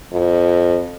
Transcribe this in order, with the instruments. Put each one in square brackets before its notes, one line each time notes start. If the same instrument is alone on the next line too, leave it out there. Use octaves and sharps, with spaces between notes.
[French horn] F2